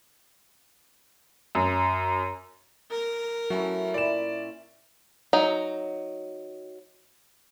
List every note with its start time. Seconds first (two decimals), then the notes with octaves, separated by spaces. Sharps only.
1.55 F#2
2.91 A#4
3.50 F#3 A3 C#4 E4
3.94 A#2 E4 D5 E7
5.33 F#3 D#4